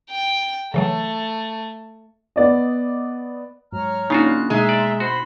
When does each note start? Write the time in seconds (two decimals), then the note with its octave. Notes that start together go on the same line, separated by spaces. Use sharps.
0.10 G5
0.74 C#3 E3 F#3 A3
2.36 B3 D5 D#5
3.72 G#2 F#3 C#5 A#5 F6
4.10 C#3 A#3 D4 D#4 F4 F#4
4.26 C6 F#6
4.50 B2 G#3 E5 A#5 C6
4.69 D5
5.00 F#4 C5 B5 C6